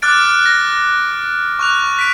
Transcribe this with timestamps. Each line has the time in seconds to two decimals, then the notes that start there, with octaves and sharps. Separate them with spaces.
0.02 D6 F6 F#6 A6 D7
0.46 A#6
1.59 C#6 F#6 F7
1.99 B6 D7